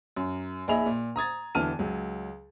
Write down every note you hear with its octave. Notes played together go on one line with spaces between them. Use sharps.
F#2
A#1 D#4 G#4 E5 B5 F7
A#2
A#5 D#6 G#6 A6
E1 D3 E3 A5 F6 D#7
C#2 F#3